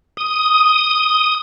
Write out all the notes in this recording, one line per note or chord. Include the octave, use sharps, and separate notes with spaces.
D#6